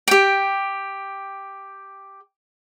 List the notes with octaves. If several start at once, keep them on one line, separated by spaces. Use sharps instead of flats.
G4 G5